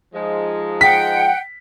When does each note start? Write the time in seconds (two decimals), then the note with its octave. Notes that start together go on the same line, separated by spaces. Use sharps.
0.14 F3 G#3 D#4
0.81 F#5 G5 B6